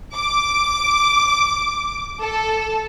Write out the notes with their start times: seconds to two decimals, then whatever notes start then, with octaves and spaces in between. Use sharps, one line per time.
0.15 D6
2.21 A4